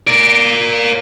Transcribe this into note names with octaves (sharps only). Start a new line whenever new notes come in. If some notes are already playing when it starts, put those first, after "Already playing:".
A#4 D5